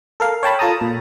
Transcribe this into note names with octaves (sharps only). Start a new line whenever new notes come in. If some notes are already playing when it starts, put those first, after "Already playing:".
A4 A#4 F5
C#5 G5 A5 B5
F4 A4 A5 A#5 D#6
A#2